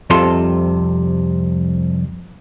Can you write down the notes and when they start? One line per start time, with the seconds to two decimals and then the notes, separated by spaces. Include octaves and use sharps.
0.10 C2 F2 C3 F4 A4 C6